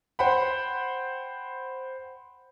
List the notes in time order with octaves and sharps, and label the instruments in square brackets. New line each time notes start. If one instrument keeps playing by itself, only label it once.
[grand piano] C5 F#5 G5 B5